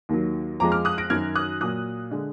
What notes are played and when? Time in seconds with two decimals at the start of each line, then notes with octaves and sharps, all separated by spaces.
0.09 D#2 D#3 F#3
0.60 F2 F3 G#3 A#5 D6
0.72 D6 F6
0.85 D#6 F#6
0.98 A#6 D7
1.10 F#2 D#3 F#3 F6 G#6
1.35 D#6 F#6
1.61 A#2 F#3 D#6 F#6
2.11 D3 G#3